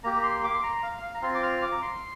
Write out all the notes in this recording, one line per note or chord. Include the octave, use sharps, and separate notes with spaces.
A#3 G4 A#5
C6
D6
C6
A#5
F5
F5
A#5
C4 F4 C6
D6
F6
D6
A#5
C6